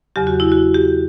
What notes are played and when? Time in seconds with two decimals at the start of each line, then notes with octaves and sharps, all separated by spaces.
0.16 E2 C#3 F#3 G4
0.27 F#4
0.40 E4
0.52 F#4
0.74 G4